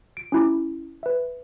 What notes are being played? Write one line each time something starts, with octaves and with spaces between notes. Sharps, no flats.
D7
C#4 E4 D6
B4 E5